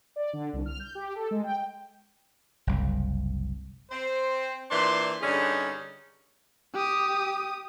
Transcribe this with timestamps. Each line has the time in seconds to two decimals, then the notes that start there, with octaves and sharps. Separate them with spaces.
0.16 D5
0.33 D3
0.53 C2
0.66 F6
0.80 G6
0.95 G4
1.15 A4
1.31 G#3
1.44 G5
2.67 F#1 C2
3.91 C4 C5
4.71 A#2 E3 D4 C5 C6
5.22 G2 D3 C#4 D#4 G#4
6.73 G4 D#6